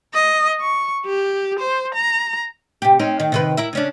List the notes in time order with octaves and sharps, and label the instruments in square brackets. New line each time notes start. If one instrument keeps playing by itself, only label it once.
[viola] D#5
C#6
G4
C5
A#5
[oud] C3 G4
C4 C#4 D#4
D#3
C3 D#3 B4
E4 A#4 E5
C#3 C#4 D4